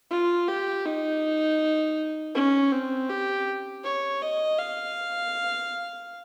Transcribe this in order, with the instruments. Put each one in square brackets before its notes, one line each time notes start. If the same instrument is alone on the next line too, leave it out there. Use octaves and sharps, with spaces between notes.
[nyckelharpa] F4
G4
D#4
C#4
C4
G4
C#5
D#5
F5